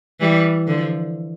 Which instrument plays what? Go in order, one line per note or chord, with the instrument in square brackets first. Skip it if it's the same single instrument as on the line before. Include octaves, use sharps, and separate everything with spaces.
[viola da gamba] E3 G3
D3 F3